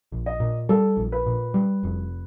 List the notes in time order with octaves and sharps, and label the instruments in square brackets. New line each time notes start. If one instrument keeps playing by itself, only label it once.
[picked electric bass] A#1
[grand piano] D#5
[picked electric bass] A#2
[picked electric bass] G3 [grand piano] A4
[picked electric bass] A#1
[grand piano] B4
[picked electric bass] A#2
G3
F1